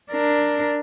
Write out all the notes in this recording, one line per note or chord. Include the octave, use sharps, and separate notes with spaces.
D4 A#4